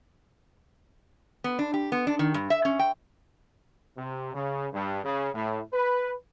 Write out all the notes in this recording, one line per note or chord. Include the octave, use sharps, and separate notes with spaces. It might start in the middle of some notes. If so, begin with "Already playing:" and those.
B3
D4
G4
B3
D4
D#3
G2
E5
C#4
G5
C3
C#3
G2
C#3
A2
B4